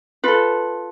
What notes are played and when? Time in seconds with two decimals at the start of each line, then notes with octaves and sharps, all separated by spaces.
0.24 F4 A4 B4